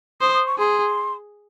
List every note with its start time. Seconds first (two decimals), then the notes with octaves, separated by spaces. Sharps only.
0.21 C5 D#6
0.34 D#6
0.47 C#6
0.58 G#4 C6